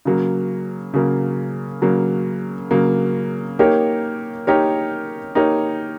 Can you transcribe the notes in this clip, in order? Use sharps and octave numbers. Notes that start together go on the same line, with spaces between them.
C#3 F#3 A#3
C#3 F#3 A#3
C#3 F#3 A#3
C#3 F#3 A#3
A#3 D#4 G4 A#4 C#5
A#3 D#4 G4 A#4 C#5
A#3 D#4 G4 A#4 C#5